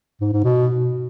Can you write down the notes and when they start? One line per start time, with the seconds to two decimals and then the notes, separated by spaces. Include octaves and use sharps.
0.21 G#2
0.32 G#2
0.44 B2